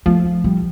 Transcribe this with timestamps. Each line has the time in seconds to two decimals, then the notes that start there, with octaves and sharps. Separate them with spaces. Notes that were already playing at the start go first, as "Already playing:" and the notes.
0.06 F3 A3
0.44 G3